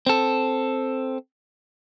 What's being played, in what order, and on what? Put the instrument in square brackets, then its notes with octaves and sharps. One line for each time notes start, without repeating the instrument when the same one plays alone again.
[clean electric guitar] C4 A4